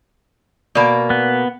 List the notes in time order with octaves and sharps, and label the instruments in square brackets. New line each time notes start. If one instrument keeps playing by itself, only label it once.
[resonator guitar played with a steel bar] B2 A#3 [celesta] D5 B5
[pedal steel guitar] B3